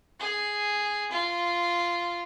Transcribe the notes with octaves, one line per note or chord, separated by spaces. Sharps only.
G#4
F4